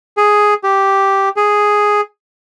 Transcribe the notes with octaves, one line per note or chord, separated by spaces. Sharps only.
G#4
G4
G#4